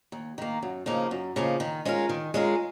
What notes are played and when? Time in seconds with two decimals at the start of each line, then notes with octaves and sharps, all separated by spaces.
0.12 D#2
0.38 D#3 A#3
0.62 F#2
0.86 C#3 F3 A#3 D#4
1.11 F#2
1.36 C#3 F3 A#3 D#4
1.60 D#3
1.85 G#3 C#4 F4 A#4
2.09 D#3
2.34 G#3 C#4 F4 A#4